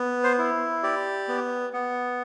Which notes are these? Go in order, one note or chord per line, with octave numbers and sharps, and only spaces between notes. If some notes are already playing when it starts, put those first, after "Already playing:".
Already playing: B3
C5
E4
G4 D5
B3
B3